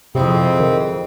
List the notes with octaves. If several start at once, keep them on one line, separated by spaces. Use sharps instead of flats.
F2 C3 G#3 C4 E4 D#5
D#3